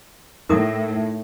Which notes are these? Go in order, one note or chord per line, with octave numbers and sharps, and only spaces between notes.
A2 D#4 A#4 D#6